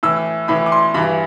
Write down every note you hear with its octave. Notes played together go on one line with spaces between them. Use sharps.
A2 E3 E6
A2 E3 B5
D6
C6
G2 E3 B5